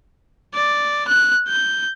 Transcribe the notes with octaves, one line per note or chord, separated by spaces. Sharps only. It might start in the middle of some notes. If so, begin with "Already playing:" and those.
D5
F#6
G6